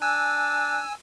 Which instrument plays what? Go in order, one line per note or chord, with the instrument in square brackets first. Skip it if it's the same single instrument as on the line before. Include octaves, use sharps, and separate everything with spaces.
[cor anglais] D4 [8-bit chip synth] G#5 E6